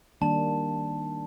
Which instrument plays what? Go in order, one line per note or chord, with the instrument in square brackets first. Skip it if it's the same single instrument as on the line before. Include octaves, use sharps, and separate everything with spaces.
[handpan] D#3 G3 A#3 D4 [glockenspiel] A5